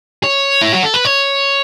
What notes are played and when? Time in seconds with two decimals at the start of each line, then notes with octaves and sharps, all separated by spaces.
0.24 C#5
0.61 E4
0.73 F#4
0.83 A4
0.94 B4
1.05 C#5